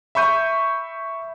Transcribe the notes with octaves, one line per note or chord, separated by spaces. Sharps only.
E5 B5 C#6 G6 D#7